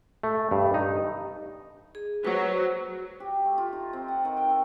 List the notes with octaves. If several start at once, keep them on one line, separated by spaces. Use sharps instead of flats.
A3
G2
D#4
G#4
F#3 B4 C5
G4
A3
F4
D#4
C4
F#5
D#3
G5
A4